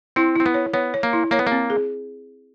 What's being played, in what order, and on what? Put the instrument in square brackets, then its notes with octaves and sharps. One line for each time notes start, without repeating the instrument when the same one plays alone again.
[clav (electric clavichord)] C4 [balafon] E4
[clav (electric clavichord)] C4 [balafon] E4
[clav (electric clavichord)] B3
[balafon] C#5
[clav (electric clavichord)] B3 [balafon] C#5
[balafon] C#5
[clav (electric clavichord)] A#3
[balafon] E4
[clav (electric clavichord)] A#3 [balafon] C#5
[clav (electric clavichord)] B3
[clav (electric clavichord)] A#3 [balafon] C4
[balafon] G#4